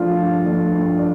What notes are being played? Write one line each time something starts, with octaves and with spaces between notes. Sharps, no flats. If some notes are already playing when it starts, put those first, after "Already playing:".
Already playing: F3 A3 D4 F4
G2
F3 A3 D4
G2
D4